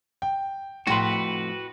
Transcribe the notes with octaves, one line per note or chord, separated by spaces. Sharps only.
G5
F2 A2 F#4 B4 G5 C6